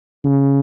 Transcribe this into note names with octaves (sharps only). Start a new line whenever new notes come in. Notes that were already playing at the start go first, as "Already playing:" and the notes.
C#3